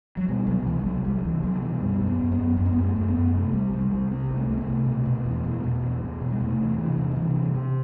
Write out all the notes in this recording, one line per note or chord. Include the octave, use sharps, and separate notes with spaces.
F#3
B2 G3
C2 F#3
F#3
C2 E3
G3
C2 F#3
C2 G3
F#3
C2 E3
C2 F#3
B2 E3
F#2 G3
F#2
B3
F#2
B3
F#2
F#2 B3
C4
F#2 B3
A3
F#2
B3
F#2
C3 A3
C2 G3
C2 G3
C2 G3
C3 C4
C2
A3
C2
B3
A3
C3
B2
B2
E2
B2
B2
E2
E2
B2
G3
C3 A3
E2
C3 E3
C3
D#3
C3 E3
C3
C3